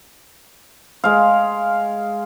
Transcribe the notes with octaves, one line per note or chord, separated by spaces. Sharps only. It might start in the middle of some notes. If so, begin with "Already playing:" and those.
G#3 F5